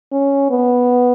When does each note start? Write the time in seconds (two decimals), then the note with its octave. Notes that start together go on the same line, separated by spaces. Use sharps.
0.12 C#4
0.50 B3